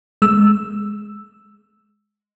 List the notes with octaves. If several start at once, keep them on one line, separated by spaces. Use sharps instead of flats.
G#3 E6